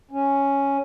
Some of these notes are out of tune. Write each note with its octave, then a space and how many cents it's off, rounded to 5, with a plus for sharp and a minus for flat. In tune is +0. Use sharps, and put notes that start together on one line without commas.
C#4 +0